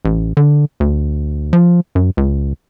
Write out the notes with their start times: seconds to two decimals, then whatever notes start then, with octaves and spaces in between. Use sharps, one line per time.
0.05 A1
0.37 D3
0.80 D2
1.53 F3
1.95 F#2
2.17 C#2